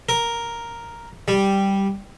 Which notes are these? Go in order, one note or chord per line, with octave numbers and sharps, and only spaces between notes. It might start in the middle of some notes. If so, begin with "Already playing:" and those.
A#4
G3